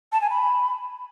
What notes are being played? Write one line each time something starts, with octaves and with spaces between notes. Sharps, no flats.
A5
G#5
B5